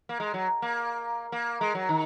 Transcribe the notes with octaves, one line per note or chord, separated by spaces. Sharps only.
A#3
G#3
F#3
A#3
A#3
G#3
F#3
D#3